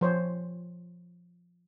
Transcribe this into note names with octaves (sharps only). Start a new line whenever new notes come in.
F3 C5 C#5